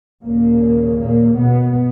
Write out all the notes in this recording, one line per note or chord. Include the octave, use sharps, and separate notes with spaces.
D#2 A#2 C#3 A#3
A#2 A#3
B2 B3